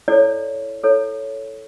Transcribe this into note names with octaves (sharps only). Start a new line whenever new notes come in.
E4 A4 C#5 D5
E4 A4 C#5